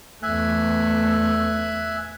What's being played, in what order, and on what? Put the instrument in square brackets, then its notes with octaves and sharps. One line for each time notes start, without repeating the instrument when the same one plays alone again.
[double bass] E2 A3 [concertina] E5 G#5 F#6